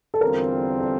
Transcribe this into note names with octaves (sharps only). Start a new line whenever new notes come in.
A4
E2 D3 G3 C4 F4 A#4
A4